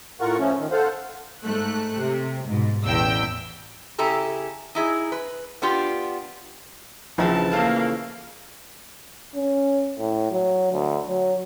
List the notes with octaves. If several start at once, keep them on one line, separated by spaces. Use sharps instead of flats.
A2 F4 A#4 F#5 C#6
F3 A3 C#4
D#3
A4 C5 F5 F#5
G#2 A3 F#6
C3
G#2 B2
A1 E2 G5 E6
C#3 E4 G4 A4 A#5
D#4 E4 G#4
B4
B3 D4 F4 G4
A#1 C#3 E3 F3 A5
A3 A#3 C#4 F5
C#4
A2
F#3
D2
F#3